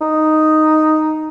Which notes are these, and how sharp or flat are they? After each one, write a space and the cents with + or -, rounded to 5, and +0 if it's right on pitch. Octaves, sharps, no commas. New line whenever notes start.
D#4 +0